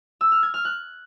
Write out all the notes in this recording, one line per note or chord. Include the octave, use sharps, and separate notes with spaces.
E6
F6
G#6
F6
F#6